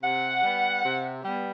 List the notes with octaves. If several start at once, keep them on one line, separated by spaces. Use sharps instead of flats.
C3 F#5
G3 B3
C3
G3 B3